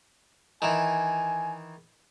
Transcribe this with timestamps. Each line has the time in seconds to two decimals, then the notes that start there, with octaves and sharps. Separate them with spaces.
0.62 D#3 E3 G#5